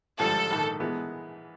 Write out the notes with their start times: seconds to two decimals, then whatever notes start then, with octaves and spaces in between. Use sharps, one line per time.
0.19 G#1 G2 D3 F3 A4
0.50 A#1 G#2 D#3
0.80 E3 G#3 B3